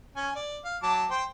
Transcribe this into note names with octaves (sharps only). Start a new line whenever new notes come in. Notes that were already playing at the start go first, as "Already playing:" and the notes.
C#4 G#5
D5
F5
F#3 A5 D6
C5 G5